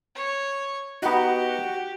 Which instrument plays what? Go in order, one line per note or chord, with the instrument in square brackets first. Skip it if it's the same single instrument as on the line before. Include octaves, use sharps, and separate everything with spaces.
[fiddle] C#5
[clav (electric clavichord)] B3 D#4 [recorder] F#4 [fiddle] G4